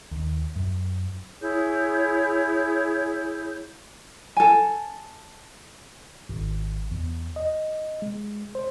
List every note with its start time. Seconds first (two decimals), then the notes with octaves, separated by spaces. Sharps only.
0.11 D#2
0.56 F#2
1.41 E4 G#4 C#5 G6
4.37 A4 G#5
6.29 G#1
6.91 E2
7.36 D#5
8.02 G#3
8.55 C5